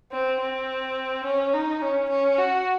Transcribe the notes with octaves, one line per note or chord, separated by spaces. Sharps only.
C4
C4
C#4
D#4
C#4
C#4
F#4